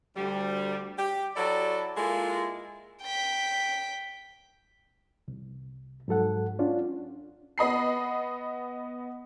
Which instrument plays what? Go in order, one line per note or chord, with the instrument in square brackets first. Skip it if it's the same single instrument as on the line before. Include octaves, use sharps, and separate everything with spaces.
[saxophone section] D2 G3
G4
F#3 E4 A4 D5
G#3 A#3 E4 F4 A4
[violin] G5 B6
[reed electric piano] C2
G#2 F#3 A4 F#5
C#4 D4 F4
[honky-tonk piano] B3 D#5 B5 C7